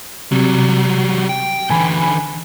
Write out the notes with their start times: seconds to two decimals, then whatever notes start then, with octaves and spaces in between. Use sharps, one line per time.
0.32 C3 F#3 G3
1.29 G5
1.70 D3 E3 G#5 B5